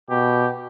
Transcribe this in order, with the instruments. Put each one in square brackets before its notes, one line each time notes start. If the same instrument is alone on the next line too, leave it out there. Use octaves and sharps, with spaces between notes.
[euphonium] B2 [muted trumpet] G4